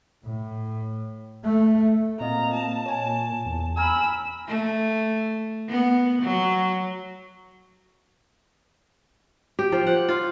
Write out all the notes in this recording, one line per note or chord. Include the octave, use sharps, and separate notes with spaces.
A2
A3
A#2 C4 D#5 F5 A#5
A5
C#5 G#5
E2
G#5 A#5 B5 E6 F6
A3
B3
F#3
G4
F3
F#5
F4